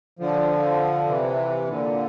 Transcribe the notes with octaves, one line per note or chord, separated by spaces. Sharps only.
D3 F3
C3 E3
A#2 D3